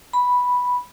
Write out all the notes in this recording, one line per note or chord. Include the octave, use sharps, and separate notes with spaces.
B5